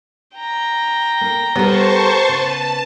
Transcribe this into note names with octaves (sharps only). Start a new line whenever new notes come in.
G5 A#5
A#3 A#4
G3 B3 G4 A4 A#4 C5 A5 C#6
C#3 B4 A5